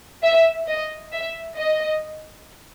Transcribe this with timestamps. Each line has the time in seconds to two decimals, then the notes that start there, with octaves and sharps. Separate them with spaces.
0.22 E5
0.67 D#5
1.12 E5
1.57 D#5